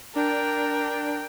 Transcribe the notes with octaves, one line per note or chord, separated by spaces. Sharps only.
D4 A#4 G5